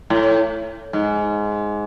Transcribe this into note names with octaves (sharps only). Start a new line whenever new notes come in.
A2
G#2